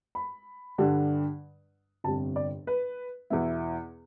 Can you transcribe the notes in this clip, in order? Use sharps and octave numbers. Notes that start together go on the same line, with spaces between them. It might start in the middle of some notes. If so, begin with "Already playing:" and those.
B5
G2 D3 G3 D4
G1 F2 C3 G3 A5
D5
B4
E2 B2 B3 E4